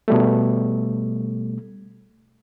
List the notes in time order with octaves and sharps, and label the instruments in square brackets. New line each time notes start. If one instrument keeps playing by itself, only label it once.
[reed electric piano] B2 G3 A3